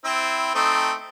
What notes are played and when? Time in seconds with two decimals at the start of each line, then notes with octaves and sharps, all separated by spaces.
0.05 C4 E4
0.55 A3 C4 D#4